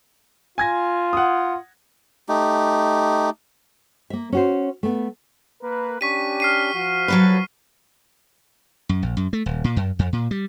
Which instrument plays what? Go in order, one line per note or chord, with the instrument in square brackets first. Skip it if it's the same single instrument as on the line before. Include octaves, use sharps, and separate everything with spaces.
[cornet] F4 [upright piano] G#5 G#6 A#6
[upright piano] F#5 D#6
[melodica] A3 D#4 G4
[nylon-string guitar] A#3 E5
C#4 F#4 C5
A3 B3
[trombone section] A#3 A#4 B4
[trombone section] C#4 D4 G4 [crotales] C#6 B6 D#7
[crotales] F6 C7 D#7
[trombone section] F3 F#4
[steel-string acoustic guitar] F#3 A4 B4
[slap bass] F#2
A#1
F#2
A3
D#1
A#2
F#2
F2
A#2
G3